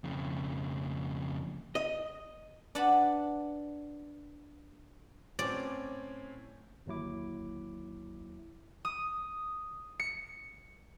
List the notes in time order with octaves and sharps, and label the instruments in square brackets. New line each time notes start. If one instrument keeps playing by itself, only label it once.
[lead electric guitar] F2 C#3
[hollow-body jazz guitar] D#5
[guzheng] D4 B4 F#5 A5 B5
[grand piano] A2 C4 C#4 [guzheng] D5
[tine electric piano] G1 D#2 F#3 E4 D6
[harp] D#6
C#7